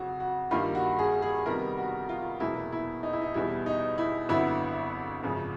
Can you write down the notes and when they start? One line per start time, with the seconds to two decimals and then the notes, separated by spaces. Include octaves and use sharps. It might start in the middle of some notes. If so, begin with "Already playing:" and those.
Already playing: F2 C#3 F#3 F#4
0.20 F#4
0.51 G2 D#3 G3 A#3 F4
0.75 F#4
0.99 G#4
1.22 G#4
1.46 F2 C3 D#3 G3 B3 A#4
1.77 F#4
2.09 F4
2.40 F1 E2 B2 F#3 A#3 E4
2.72 E4
3.03 D#4
3.13 E4
3.22 D#4
3.34 E2 B2 G3 E4
3.66 D#4
3.98 E4
4.29 G1 F2 D3 F#3 B3 E4
5.24 G#1 F#2 C#3 F3